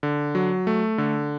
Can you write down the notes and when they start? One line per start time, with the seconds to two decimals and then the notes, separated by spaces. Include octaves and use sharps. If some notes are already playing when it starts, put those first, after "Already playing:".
0.03 D3
0.35 F#3
0.67 A3
0.98 D3